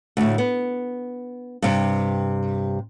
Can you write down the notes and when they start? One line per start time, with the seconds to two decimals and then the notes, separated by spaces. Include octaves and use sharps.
0.17 D2 A2
0.38 B3
1.62 G2 C3